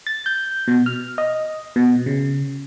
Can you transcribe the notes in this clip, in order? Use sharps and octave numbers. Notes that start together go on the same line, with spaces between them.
A6
G6
B2
F6
D#5
B2
C#3